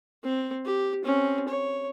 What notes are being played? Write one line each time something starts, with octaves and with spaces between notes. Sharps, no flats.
C4
G4
C4 C#4
C#5